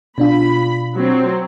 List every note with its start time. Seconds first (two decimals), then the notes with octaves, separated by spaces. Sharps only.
0.18 B2 D4 F4 B5
0.95 F#3 C4